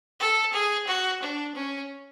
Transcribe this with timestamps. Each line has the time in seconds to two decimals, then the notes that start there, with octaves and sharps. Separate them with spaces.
0.20 A4
0.53 G#4
0.87 F#4
1.22 D4
1.55 C#4